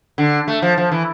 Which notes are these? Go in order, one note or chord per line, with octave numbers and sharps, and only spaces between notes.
D3
A3
F3
F3
E3